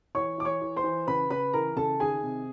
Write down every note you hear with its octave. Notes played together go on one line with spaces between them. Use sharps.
E3 C#5 C#6
E3 D6
C#5 C#6
E3
C5 C6
E3
C#3 B4 B5
C#3 B4 B5
E3 A#4 A#5
C#3 A4 A5
D#3 G#4 G#5
C3